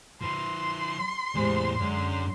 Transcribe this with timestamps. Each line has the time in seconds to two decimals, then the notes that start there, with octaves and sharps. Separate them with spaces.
0.21 F3 B4 C6
1.35 E2 A2 G3 G#3 C5
1.78 F#2 D3 G#3 C#4 D4